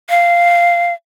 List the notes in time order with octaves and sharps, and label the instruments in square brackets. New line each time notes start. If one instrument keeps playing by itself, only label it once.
[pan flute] F5